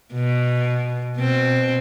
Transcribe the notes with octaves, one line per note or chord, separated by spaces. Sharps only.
B2
B2 C4